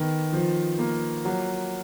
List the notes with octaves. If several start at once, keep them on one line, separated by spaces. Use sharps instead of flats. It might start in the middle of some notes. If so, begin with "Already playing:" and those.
Already playing: D#3 B3
F3
A#3
F#3